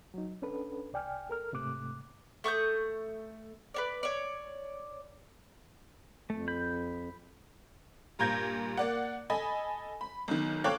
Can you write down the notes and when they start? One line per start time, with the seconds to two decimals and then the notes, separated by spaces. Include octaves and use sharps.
0.14 F#3 D#4
0.42 C#4 D4 A4 B4
0.93 C2 D5 G5 G#5 F6
1.30 A4 A#4 F6
1.53 G#2 C3 A3 D6 F#6
2.44 A3 C#6 D#6 G6
3.74 B4 C#5 D5
4.03 C#5 D5
6.30 F2 A3
6.48 B5 G6
8.19 G2 A#2 A#5 G6 G#6 A#6
8.77 A#3 D5 F#5
9.30 A4 D#5 G#5 B5
10.01 B5
10.28 B1 D#3
10.64 A4 C#5 F5 G5 D6 F#6